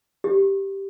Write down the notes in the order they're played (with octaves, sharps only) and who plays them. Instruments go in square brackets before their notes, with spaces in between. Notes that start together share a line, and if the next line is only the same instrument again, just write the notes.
[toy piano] G4